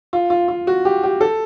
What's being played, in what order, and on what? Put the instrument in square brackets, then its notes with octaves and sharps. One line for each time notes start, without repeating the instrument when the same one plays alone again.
[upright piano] F4
F4
F4
F#4
G4
G4
A4